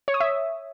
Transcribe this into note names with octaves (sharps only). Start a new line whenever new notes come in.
C#5
D#6
E5